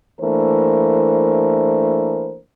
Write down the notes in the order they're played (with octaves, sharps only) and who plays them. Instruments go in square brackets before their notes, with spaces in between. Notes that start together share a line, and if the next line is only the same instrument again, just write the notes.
[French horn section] E3 A3 A#3 D4 A#4 C5